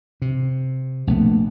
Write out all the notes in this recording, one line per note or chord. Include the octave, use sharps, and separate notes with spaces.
C3
A#1 A3 B3